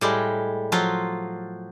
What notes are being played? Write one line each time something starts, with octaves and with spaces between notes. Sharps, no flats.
A2 G3 G#3
F3 F#3 F4